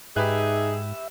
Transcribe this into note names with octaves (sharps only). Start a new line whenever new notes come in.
G#2 D#4 G4 G#4 B4 E5 F#6